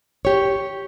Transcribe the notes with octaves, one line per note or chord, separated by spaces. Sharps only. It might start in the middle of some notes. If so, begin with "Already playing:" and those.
G4 C#5